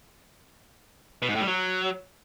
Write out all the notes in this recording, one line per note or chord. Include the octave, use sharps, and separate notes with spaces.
B2
G#2
A2
G3
F#3